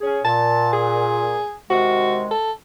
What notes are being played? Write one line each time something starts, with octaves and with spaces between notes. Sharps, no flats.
C#4 G#4
A#2 A5
G#4
C3 D#3 G#3 F#4
A4